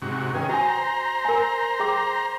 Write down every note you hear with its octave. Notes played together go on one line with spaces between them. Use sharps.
G#2 C3 F#4
D#3 C#4 G#4 B4 G5
F#4 C5 G#5 A#5
A#4 G#5
G#4 G5 D6